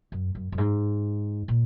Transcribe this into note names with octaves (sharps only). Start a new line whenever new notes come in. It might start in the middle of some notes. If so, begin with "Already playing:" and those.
F#2
F#2
F#2
G#2
A#2